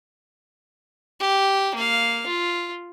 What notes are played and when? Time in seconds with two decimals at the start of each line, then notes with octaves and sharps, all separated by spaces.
1.20 G4
1.75 A#3 F5
2.27 F4